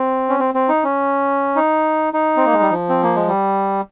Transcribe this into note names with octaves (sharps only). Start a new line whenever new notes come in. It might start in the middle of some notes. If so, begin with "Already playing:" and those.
Already playing: C4
C#4
C4
C4
D#4
C#4
D#4
D#4
C4
A#3
G#3
G3
F3
C4
A#3
G#3
G3